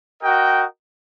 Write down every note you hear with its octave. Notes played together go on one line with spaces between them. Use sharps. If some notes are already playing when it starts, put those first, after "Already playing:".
F#4 A#4 D#5 G5